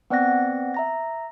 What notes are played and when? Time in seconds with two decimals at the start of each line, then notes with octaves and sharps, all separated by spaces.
0.10 B3 C4 D5 F#5 F#6 A#6
0.74 E5 A#5 A#6